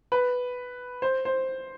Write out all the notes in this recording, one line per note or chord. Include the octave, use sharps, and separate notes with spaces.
B4
C5
C5